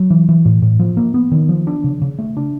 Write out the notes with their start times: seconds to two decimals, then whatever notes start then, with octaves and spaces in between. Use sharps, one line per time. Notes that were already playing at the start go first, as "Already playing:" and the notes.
Already playing: F#3
0.10 E3
0.29 E3
0.45 A2
0.62 A2
0.80 F3
0.97 A#3
1.14 B3
1.32 D#3
1.49 F3
1.67 D4
1.84 C#3
2.02 C#3
2.19 A3
2.37 D4